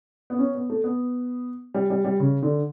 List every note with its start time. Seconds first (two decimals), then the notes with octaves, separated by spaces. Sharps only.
0.30 B3
0.39 C#4
0.55 B3
0.70 A3
0.84 B3
1.74 G3
1.90 G3
2.05 G3
2.20 C#3
2.43 D3